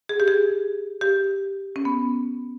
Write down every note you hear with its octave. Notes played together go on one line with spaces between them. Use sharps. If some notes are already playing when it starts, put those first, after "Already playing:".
G#4
G4
G#4
G4
C#4
B3